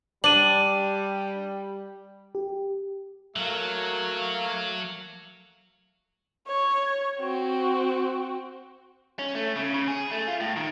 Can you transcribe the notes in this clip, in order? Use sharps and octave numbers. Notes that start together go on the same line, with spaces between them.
G3 D4 D#7 F#7
G4
F#3 A3 A#3 F5
C#5
C4 F#4
C#4
A3
C#3
C#3
G#4
A3
F4
A2
D#3